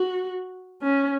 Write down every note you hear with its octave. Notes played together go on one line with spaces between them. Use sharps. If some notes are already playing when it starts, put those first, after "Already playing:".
Already playing: F#4
C#4